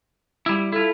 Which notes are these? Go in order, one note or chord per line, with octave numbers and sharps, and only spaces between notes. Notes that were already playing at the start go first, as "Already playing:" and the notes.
G3 E4
E4 F4 A4